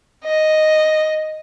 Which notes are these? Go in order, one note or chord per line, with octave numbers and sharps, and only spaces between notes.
D#5